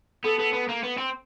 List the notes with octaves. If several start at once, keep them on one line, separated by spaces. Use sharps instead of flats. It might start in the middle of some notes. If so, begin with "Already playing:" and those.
B3 A4
B3
B3
A#3
B3
C4